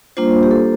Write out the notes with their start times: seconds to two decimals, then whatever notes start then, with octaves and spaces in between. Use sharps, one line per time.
0.17 G3 A#3 D4 F4 C5
0.43 G4
0.51 A4